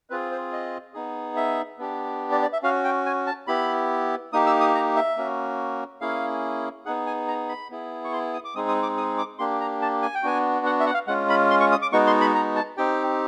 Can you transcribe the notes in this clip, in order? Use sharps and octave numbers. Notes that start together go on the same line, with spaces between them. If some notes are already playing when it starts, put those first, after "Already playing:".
C4 F4 G#4 B4
C5
D#5
B3 D#4 G#4
E5
B3 D4 G4
D5
D5
E5
C#4 F#4 F5
G5
G#5
A5
B3 E4 G4 B5
A#3 D#4 G4 D#6
E6
D#6
A#5
E5
A#3 C#4 F#4
A#3 C#4 E4 G#4 F5
B3 D#4 G#4 F#5
G#5
A#5
B5
B3 E4 G#4
C#6
C6
D#6
D6
G#3 C4 D#4 G#4 D#6
D#6
D6
D#6
D6
A#3 D4 G4 C6
A#5
A5
G#5
G5
B3 D4 F#4 G#5
F#5
E5
F#5
F5
G#3 C#4 F4 F#5
B5
C6
C#6
D#6
D6
G#3 B3 D#4 F#4 C#6
C6
B5
A#5
A5
C4 D#4 G4 G5